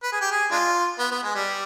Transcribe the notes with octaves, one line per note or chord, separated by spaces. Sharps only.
B4
G#4
G4
G#4
G#3 D4 F4
B3
B3
G#3
G3